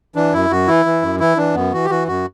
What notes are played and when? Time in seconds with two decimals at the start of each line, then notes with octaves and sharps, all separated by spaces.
0.16 E3 D4
0.33 F#2 E4
0.50 F#2 F#4
0.67 E3 E4
0.86 E3
1.02 F#2
1.20 E3 E4
1.37 E3 D4
1.55 F#2 B3
1.73 E3 F#4
1.85 G4
1.90 E3 F#4
2.08 F#2 F#4